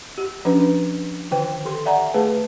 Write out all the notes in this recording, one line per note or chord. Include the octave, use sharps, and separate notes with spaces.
G4
F3 C#4 D4 B4
D3 D#3 G5
G4 A4 C6
D5 E5 F#5 G#5 A#5
A3 G#4 B4 A5